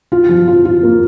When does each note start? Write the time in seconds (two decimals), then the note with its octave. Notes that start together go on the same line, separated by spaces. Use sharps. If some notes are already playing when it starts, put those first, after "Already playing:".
0.12 F4
0.29 F3
0.48 F4
0.65 F4
0.83 A#3